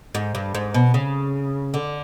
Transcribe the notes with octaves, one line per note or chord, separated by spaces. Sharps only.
G#2
G2
G#2
B2
C#3
D3